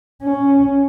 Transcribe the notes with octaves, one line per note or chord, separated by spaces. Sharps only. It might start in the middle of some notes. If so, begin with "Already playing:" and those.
C#4